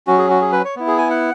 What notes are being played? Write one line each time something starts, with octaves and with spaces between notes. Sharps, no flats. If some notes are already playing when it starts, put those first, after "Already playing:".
F#3 C#4 F#4
G#4
F#4
G#4
B4
C#5
B3 E4
G#4
G#5
F#5